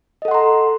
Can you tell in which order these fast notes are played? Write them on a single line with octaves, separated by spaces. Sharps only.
D#5 A4 F#5 C6 A#5